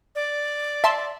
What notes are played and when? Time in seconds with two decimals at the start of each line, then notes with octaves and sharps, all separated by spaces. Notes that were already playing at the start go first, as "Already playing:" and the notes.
0.15 D5
0.84 E5 A5 C6